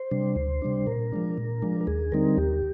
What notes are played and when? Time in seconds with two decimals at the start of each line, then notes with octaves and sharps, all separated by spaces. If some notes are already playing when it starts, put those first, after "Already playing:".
Already playing: C5
0.11 C3 G3 D4
0.36 D2
0.62 C3 G3 D4
0.87 A#2 A#4
1.12 F3 G#3 D4
1.38 A#2
1.62 F3 G#3 D4
1.81 A#4
1.87 D#2 G#4
2.12 D3 G3 C4 D#4 A#4
2.37 D#2 G4